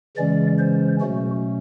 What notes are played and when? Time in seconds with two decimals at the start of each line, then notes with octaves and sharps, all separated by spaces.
0.17 C#3 E3 G#3 C#4 D5
0.59 C5
1.00 B2 F#3 A3 C#4 F#4